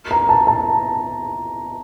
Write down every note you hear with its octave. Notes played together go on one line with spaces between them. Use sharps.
A#5
A5
A5